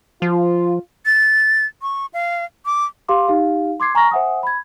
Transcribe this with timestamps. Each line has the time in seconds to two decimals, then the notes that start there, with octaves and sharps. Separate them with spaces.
0.22 F3 F4
1.06 A6
1.82 C#6
2.13 F5
2.66 D6
3.08 G4 F5 C6 D6
3.28 D#4 G4 F5
3.80 C6 D6 G#6 C7
3.95 G#5 A#5 C#6 F6 A#6
4.11 C5 E5 F#5 G#5 D#6
4.43 B5 G#6